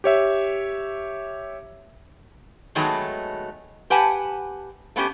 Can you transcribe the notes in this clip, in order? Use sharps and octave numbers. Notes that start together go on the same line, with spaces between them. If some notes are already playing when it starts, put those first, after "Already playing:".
G4 C#5 E5
D#3 F#3 G#3 A3 B3
G4 B4 F#5 G#5 A5
A3 B3 C#4 G4